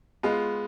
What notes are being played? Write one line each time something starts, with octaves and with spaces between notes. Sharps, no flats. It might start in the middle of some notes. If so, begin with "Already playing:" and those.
G#3 B3 F4